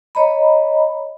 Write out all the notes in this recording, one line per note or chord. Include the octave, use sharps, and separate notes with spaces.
C#5 D#5 A#5 B5